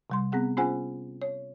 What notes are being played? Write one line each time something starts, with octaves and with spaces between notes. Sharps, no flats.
C3 G3 C6
B3 C4 G#4 F#5
C#4 F4 G#4 C5 F#5 G#5
C#5